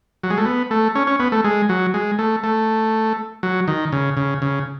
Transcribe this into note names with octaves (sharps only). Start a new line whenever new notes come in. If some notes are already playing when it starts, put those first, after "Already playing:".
F#3
G#3
A3
B3
A3
C#4
C#4
B3
A3
G#3
F#3
G#3
A3
A3
F#3
D#3
C#3
C#3
C#3